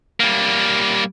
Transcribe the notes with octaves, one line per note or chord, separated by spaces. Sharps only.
G3 A#3